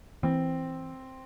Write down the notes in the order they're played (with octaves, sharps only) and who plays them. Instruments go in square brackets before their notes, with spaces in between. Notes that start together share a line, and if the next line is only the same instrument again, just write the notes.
[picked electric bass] E3 [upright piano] C4